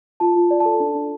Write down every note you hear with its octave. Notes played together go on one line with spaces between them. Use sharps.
F4 A5
F4
D5
A5
A4
D4
D4